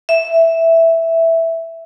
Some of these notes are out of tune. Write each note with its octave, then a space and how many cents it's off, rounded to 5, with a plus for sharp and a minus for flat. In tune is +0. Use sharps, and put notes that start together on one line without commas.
E5 +0